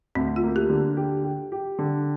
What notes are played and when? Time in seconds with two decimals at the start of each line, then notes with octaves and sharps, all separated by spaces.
0.15 D2 C4
0.36 F4
0.43 A#3
0.56 G4
0.70 D3
0.97 G4
1.24 G4
1.52 G4
1.79 D3